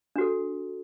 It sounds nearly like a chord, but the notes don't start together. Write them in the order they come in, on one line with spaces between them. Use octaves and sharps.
D4 F#4 A4